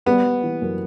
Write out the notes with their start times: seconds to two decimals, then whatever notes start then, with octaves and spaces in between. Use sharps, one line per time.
0.06 G3 B3
0.24 G3
0.43 E3
0.62 F#2